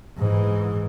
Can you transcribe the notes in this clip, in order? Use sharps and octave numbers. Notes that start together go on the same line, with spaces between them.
G#2 E3